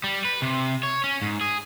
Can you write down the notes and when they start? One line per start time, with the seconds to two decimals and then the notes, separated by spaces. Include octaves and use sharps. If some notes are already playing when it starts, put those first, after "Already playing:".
0.04 G3
0.25 B4
0.42 C3
0.83 C#5
1.04 C#4
1.22 G#2
1.41 G#4